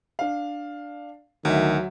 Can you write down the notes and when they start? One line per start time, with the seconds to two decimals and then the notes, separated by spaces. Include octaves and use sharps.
0.19 D4 F5
1.45 D2 D#3 F#3 E5